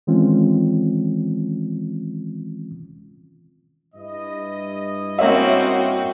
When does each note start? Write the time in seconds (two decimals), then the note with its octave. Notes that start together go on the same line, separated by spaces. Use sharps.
0.07 D#3 E3 G#3 C4 C#4 F4
3.95 G2 E4 D#5
5.19 A#3 C4 C#4 F#4 E5